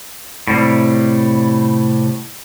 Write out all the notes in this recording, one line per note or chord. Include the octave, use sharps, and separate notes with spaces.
A2 C3 G3